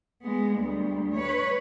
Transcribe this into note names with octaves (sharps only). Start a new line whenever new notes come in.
G#3 B3
D2 G3
B4 C#5